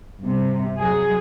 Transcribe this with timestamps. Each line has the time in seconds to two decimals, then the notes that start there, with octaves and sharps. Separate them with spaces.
0.20 G2 C3
0.79 F#3 G#4